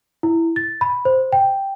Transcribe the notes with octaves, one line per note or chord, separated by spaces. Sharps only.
E4
A6
B5
C5
G5